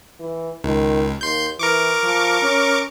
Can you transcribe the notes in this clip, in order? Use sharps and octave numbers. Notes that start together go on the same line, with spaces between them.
E3
C#2 D#3
D#2 C6 G6
E3 A#4 C#6 D6
F3
C#4